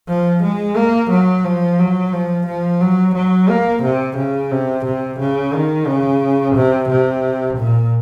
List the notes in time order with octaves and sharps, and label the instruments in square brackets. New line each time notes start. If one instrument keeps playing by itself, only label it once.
[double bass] F3
G#3
A#3
F#3
F3
F#3
F3
F3
F#3
F#3
A#3
C3
C#3
C3
C3
C#3
D#3
C#3
C3
C3
A#2